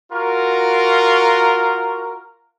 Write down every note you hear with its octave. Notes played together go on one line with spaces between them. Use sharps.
F4 F#4 A#4